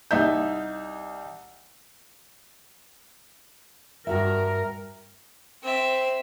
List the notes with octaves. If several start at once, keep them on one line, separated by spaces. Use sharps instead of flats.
C2 D#4 E5 G6
G2 F#4 A#4 E5
C4 E5